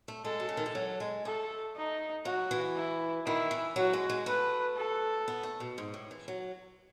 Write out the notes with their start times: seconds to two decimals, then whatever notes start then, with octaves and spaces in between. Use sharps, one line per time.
0.08 A3
0.24 G#3 A4
0.40 B2
0.49 C#3
0.57 D#3
0.66 E3
0.75 F#3
1.00 G#3
1.25 A3 A4
1.76 D#4
2.25 F#3 F#4
2.51 E3
2.76 E4
3.25 D#3 E4
3.51 E3
3.76 F#3 F#4
3.93 G#3
4.10 G#3
4.26 A3 B4
4.77 A4
5.28 B3
5.43 A3
5.60 B2
5.78 G#2
5.94 A2
6.11 E3
6.28 F#3